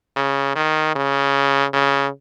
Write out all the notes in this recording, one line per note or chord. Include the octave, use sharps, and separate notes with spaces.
C#3
D#3
C#3
C#3